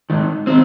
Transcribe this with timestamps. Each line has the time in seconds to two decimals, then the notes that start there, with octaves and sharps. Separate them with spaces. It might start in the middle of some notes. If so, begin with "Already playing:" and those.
0.10 G#2 D#3
0.47 D#3 C4